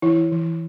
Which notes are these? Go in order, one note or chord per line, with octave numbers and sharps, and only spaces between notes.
E3 E4
E3